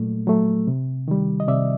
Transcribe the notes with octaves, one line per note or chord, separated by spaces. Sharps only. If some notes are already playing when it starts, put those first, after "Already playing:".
Already playing: A#2 F#3 A3
F#3 A3
C3
D#3 G3
D#5
C3 D5 E5